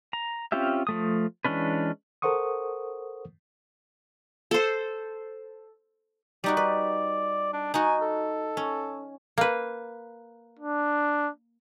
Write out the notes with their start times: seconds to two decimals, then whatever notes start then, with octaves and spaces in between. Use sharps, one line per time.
0.13 A#5
0.52 C4 C#4 F4 G4 E5
0.87 F3 A3 D#6
1.45 E3 G#3 C#4 D4 B4
2.22 A4 A#4 C5 F#5 C#6 D#6
4.51 A4 C5
6.44 G3 D#4 F#4 D5
6.57 B4 D5
7.53 D4
7.74 D#4 F#4 G#5
8.02 A4
8.57 C#4
9.38 A#3 B4
10.59 D4